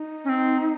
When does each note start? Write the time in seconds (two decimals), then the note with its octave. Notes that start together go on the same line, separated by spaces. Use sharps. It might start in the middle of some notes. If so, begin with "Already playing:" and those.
Already playing: D#4
0.24 C#4
0.29 C4